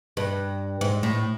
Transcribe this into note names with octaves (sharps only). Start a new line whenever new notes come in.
G2
G#2
A2